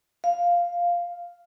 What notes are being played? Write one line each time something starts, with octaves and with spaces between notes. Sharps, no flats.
F5